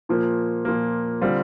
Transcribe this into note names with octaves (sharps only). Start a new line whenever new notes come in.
A#2 F3 A#3
A#2 F3 A#3
D3 G3 C4 F4